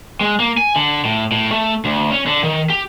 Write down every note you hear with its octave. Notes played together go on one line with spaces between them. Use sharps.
G#3
A#3
G#5
D3
A2
A2
A3
D2
C#4
D3
D#3
G4